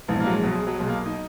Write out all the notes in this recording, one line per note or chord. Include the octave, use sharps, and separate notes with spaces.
A#1 G#2 E3 B3
A#3
F#3
G#3
B1 B2 F#3
G#3
F#3
B1 B2 G#3
A#3
D#4